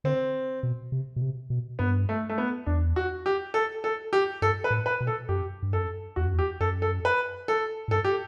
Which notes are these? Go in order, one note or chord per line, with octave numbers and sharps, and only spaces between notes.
D3 C4
B2
C3
B2
C3
B2
G2 B3
A3
A3
B3
E2 D4
F#4
G4
A4
A4
G4
G2 A4
B4
A2
B4
B2
A4
F#2 G4
G2
F#2 A4
E2 F#4
F#2
E2
G4
F#2 A4
A4
B4
A4
A2
G2 A4
G4